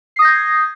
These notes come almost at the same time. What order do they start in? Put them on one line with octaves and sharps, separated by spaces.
C7 D#6 A#6 G6 G#6